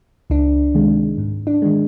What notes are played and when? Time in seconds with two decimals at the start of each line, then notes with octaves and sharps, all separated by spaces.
0.30 C#2 D4
0.75 C3 D#3 G#3
1.18 G#2
1.47 D4
1.62 D#3 G#3